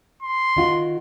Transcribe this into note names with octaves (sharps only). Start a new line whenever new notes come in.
C6
D#3 F4 F#4